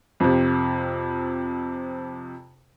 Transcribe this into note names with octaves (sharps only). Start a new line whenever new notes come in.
F2 C3